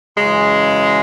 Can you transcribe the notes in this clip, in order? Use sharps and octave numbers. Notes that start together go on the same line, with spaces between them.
F#2 C#3 E3 G#3